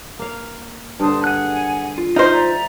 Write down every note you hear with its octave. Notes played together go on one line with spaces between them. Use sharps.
A#3 F5
G2 D3 C5 A5 D#6
G#4 F#5 G#5 F#6
F4
D#4 C5 D#5 F6
D5 E5 A#5